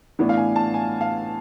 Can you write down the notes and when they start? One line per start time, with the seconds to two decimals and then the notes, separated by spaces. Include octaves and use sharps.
0.19 A2 E3 B3 D4
0.29 F5
0.37 G#5
0.56 A5
0.74 G#5
1.01 F5